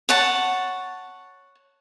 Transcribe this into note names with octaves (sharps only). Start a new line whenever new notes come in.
C#5 F#5 A5